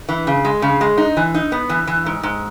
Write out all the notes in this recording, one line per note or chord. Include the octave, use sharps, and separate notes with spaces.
E3
C#3
G#3
C#3
G#3
D#4
E3
D#4
B3
E3
E3
G#2
G#2